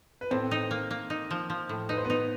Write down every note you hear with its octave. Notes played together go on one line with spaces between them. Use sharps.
B4
A2 C4 C5
D#4
A#3
A#3
D#4
F3
F3
A2
D#4 B4
C5
B3 D#4 B4